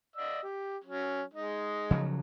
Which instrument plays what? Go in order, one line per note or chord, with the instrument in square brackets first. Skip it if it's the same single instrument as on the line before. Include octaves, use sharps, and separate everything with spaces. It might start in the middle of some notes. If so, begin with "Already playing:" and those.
[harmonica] D5 D#5 E6
G4
F#3 C#4
G#3 D#4
[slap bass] C#3 F3 F#3